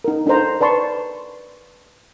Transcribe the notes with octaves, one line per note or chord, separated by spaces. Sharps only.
D#4 A#4
D4 D#4 A4 A#4 C5 A#5
B4 D5 A5 C6 C#6